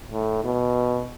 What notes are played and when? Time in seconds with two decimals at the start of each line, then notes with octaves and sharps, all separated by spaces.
0.11 A2
0.44 B2